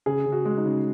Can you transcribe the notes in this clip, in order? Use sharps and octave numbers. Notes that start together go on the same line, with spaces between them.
C#3 G#4
C#3
F#4
G#3
D#4
C#3